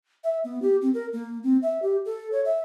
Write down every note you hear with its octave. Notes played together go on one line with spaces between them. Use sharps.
E5
B3
G4
C4
A#4
A#3
C4
E5
G4
A4
C#5
E5